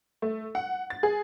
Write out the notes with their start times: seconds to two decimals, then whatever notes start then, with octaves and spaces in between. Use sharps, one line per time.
0.22 A3
0.55 F#5
0.90 A6
1.03 G#4